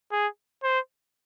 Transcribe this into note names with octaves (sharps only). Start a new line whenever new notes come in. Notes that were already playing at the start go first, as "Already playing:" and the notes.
G#4
C5